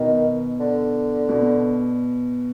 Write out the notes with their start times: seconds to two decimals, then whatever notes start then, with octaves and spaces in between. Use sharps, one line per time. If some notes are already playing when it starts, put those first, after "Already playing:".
Already playing: B2 D#3
0.60 D3
1.29 B2